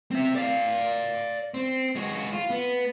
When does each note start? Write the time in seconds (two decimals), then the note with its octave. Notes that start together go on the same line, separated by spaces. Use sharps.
0.11 C4 E5
0.35 D5 F5
1.54 C4
1.96 G#3 F#4
2.33 F4
2.50 B3